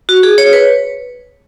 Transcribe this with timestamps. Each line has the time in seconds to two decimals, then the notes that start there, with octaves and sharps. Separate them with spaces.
0.09 F#4
0.23 G#4
0.38 C#5
0.53 B4